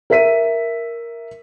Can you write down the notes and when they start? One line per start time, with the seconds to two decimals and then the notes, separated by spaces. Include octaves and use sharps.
0.10 A#4 E5 B6 D#7